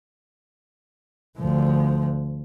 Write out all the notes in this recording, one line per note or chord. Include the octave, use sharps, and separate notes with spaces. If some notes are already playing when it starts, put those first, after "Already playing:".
D2 F3